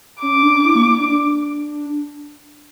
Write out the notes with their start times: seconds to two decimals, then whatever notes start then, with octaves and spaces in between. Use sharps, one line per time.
0.21 C#4 D6
0.43 D4
0.65 E4
0.75 A#3
0.98 D4
1.08 D4